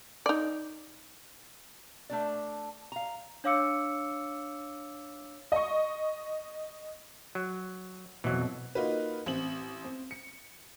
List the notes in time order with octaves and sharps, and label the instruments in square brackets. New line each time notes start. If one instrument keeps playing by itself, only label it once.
[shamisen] D#4 D5
[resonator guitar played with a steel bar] A3 D4 D5
F5 A#5
[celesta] D4 C#5 F5 D6 E6 C#7
[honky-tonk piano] D#5 C#6
[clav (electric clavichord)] F#3
[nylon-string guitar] F2 B2 [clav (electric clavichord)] E3 F#3
[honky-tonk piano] A#3 D#4 F4 F#4 B4
A1 C4 F#7
C4
C#7